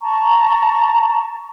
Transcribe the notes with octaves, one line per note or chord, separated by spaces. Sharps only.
A5 A#5 C#6